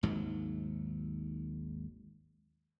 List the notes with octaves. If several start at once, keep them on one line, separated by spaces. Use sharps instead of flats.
G#1 D#2 G#2 F#3